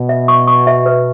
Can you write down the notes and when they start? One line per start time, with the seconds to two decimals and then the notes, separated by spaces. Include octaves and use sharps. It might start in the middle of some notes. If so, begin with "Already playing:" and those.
Already playing: B2
0.09 E5
0.28 C#6
0.47 C#6
0.67 E5
0.86 B4